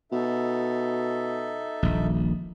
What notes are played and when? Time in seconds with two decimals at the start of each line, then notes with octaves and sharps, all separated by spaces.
0.12 B2 D#4 A4 E5
1.83 D#1 A#1